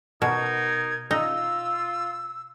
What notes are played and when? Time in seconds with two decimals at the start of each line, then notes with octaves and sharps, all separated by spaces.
0.22 B2 D#4 A#4 G#6
1.11 D#4 F4 E6